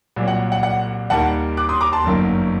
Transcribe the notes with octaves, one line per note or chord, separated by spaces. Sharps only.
C2 A#2 F#3
F#5
F#5
F#5
D#2 D#3 G3 A#3 F#5 A5
D6 F#6
C6 D#6
A#5 D6
A5 C6
G1 F#2 D#3 F#3 A#3